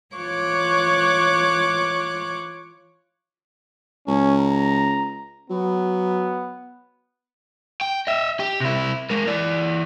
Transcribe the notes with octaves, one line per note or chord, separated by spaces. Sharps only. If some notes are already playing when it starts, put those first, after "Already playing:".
E3 F4 C#5 C#6 D6 F#6
C#2 C#4
A#5
F#3 B3
G5
D#5 E5
G4
C3 E4
G#3 A#4
E3 D5